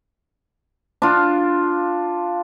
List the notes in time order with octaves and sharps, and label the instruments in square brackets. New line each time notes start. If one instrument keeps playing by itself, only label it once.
[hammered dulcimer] D4 F4